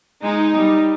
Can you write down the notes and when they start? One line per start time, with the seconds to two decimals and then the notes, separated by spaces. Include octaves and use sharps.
0.23 G#3 D#4
0.56 G3